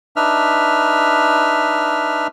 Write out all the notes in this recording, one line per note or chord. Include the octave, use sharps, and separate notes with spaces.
D4 D#4 B4 E5 F6